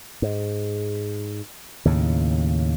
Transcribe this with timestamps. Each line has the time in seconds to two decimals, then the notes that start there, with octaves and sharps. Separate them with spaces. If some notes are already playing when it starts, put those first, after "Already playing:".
0.22 G#2
1.85 D#2 A2 C#3